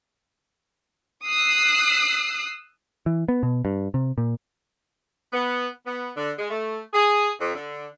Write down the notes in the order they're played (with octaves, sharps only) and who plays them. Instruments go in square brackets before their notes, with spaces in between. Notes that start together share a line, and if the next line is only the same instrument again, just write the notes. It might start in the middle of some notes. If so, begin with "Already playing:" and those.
[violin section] D#6 E6 F#6 C7
[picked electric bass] E3
B3
B2
G2
C3
A#2
[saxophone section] B3
B3
D3
G#3
A3
G#4
F2
D3